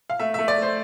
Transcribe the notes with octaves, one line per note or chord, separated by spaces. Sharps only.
F5
A3 E5
A3 E5
D5
A3 C5